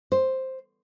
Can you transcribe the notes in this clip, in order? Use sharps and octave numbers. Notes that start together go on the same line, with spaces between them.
C5